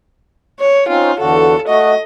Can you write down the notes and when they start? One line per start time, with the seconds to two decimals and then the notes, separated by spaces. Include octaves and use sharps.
0.60 C#5
0.89 C4 C#4 D#4 F4
1.20 E2 D3 F#4 A4
1.68 A3 F#4 D#5